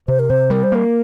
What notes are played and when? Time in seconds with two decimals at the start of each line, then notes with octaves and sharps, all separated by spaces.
0.08 C3 C5
0.19 A#4
0.30 C3 C5
0.50 G3 A#4
0.63 C5
0.72 A#3 A#4